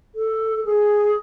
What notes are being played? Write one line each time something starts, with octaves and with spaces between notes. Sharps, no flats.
A4
G#4